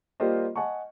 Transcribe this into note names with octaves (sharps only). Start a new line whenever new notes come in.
G3 A#3 F4 G4 C5 D#5
D#5 F#5 G#5 A5 C#6